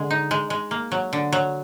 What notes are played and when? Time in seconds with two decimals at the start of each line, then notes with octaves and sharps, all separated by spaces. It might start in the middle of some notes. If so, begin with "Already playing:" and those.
Already playing: D3 G#3
0.11 D#4
0.31 G#3
0.50 G#3
0.71 A#3
0.92 F#3
1.13 D3
1.32 F#3